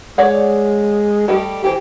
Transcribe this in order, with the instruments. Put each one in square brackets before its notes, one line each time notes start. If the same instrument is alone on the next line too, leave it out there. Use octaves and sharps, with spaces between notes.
[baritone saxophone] G#3 [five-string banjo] C#5 D5 F#5
[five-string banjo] G3 A3 D#5 [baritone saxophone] G4
[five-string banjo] E3 C5 [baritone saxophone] G4